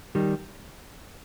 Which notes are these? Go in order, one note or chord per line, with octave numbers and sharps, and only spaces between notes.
D#3 G3